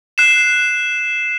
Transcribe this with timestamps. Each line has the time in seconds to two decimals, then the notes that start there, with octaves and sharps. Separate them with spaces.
0.18 F#6 C7 E7